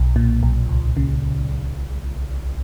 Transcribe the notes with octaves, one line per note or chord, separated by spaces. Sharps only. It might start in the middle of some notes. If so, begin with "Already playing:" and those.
Already playing: B1
A#2
B1
C#2
C#3